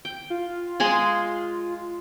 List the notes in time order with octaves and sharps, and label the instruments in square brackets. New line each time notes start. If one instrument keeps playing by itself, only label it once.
[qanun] G5
[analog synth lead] F4
[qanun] G#3 G#4 C6